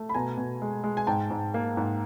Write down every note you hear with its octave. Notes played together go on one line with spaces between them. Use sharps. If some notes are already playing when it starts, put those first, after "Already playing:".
Already playing: A3
B5
B2 G#5 A#5
B2
G#3
G#3
G#5
G#2 G5 A5
G#2
A#3
G#2